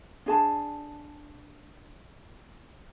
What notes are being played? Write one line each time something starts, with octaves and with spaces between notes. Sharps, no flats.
D4 G#4 A5